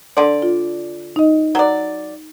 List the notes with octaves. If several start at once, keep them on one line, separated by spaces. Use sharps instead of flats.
D3 D5 C6
F4
D#4 D#5
F#3 D5